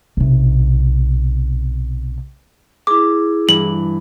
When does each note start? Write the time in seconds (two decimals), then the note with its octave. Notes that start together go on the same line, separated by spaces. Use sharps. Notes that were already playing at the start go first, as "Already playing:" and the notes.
0.17 B1 C3
2.87 E4 G#4 D6
3.49 G2 E3 F#7